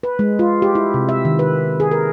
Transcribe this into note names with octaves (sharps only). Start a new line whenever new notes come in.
B4
G#3
F4
G4
E4
C3
E5
D#3
B4
G#4
A#4